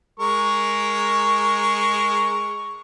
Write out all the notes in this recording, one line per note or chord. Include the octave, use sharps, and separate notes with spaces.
G#3 A#4 C#6